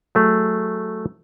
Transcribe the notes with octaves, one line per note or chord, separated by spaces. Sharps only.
F#3 A3 G#4